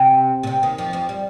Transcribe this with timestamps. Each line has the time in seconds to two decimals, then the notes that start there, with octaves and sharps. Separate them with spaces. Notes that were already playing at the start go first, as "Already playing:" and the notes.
Already playing: C3
0.43 A#2
0.47 C3
0.63 D#2 D#3
0.78 F2 F3
0.93 F2 F3
1.09 G3